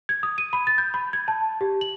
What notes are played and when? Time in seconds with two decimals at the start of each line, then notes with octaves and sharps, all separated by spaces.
0.09 G#6
0.23 D#6
0.38 D#7
0.53 B5
0.67 A6
0.78 G6
0.94 B5
1.13 G#6
1.28 A5
1.61 G4
1.81 F#7